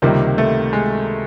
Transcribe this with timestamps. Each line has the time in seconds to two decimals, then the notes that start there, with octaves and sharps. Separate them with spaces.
0.02 C#2 C3 D#3 G3 A#3
0.38 A3
0.73 G#3